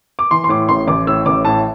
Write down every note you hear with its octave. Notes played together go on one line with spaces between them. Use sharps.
D6
E3 C6
C6
A2 D6
A1 C6
A1 D6
A2 E6
A1 D6
A2 A5